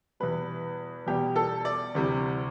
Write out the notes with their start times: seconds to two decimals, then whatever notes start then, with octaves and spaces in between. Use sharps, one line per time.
0.20 E2 B2 G3 B4
1.07 E2 B2 G3 G4
1.36 A4
1.65 D5
1.95 D2 C3 E3 G3